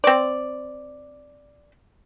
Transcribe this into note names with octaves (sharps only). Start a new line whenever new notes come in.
C4 D5